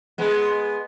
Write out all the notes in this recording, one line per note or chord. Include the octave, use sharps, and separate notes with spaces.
G#3 B3